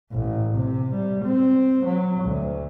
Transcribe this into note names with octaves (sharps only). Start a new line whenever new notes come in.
A1
C3
G3
C4
F#3
D2